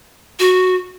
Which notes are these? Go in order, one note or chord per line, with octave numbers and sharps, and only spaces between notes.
F#4